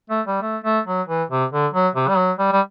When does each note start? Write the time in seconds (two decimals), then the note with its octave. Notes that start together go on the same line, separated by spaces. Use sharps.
0.10 A3
0.27 G3
0.42 A3
0.64 A3
0.87 F#3
1.08 E3
1.30 C3
1.52 D3
1.73 F#3
1.95 C3
2.08 G3
2.17 F#3
2.39 G3
2.52 G3